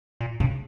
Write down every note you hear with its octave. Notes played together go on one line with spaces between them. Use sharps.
A#2
G2 C#3